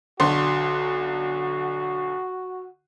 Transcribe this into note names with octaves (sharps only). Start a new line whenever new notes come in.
B1 D3 F#4 C6